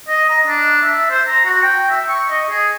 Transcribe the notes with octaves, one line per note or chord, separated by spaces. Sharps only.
D#5
A#5
D4
E5
C5
A#5
F#4
G5
E5
C#6
D#5
G#4